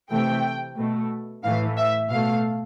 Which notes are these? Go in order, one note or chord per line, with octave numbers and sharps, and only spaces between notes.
C3 E3 A3 G5
B2 A3
A2 E3 A3 F5
E5
B2 A3 F5